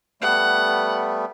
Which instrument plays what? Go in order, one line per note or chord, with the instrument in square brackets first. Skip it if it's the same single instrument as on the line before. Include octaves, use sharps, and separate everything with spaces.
[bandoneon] G3 A3 B3 [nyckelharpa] F#5